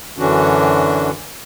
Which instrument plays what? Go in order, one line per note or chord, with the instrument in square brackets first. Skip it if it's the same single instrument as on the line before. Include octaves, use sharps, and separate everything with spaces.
[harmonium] F#2 D3 E3 C#4 D4 F#4